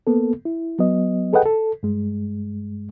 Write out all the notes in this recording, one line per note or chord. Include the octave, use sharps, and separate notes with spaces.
A#3 B3 A4
E4
F#3 B3 D#5
G#4 A4 B4 D#5 F#5 G5
A4
G2 G#3